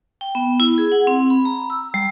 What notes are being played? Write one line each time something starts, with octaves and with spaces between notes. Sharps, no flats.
G5
B3
E4
G#4
F#5
C4
B5
A#5
E6
G3